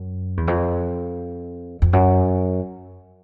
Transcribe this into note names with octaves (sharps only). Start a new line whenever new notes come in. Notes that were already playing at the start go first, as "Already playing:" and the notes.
Already playing: F#2
E2
F2
F2
F#2